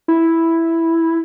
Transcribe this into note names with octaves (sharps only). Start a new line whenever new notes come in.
E4